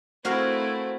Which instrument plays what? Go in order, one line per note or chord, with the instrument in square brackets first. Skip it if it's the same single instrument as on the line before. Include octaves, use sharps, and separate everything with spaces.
[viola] A3 E4 [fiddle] C4 [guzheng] F#4 A#4 F5 [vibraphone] C5